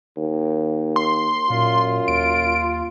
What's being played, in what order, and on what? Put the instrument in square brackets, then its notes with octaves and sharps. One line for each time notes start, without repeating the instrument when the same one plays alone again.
[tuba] D#2
[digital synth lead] C6
[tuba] F#2 [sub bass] A#2 [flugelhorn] F4
[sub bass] D#2 [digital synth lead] D7